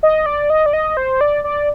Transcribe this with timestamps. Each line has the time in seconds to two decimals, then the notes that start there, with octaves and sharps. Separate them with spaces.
0.03 D#5
0.26 D5
0.50 D#5
0.66 D5
0.73 D#5
0.97 C5
1.21 D5
1.44 D5